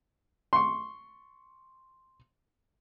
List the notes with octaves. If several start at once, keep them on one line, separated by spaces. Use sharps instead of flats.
C6 C#6